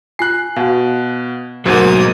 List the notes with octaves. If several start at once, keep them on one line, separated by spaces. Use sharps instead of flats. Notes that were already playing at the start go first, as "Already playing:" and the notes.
F4 G#5 F#6 C7
B2 F#4 F5
D2 G#2 B2 F#3 A#3 F#4 C5 D#6